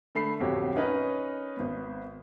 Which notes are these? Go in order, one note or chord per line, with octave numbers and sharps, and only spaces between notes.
D3 A3 B5 C7
D1 F2 F#4 G4 C#5
C#4 D#4 A#4 B4 C#5 D#5
G#1 B3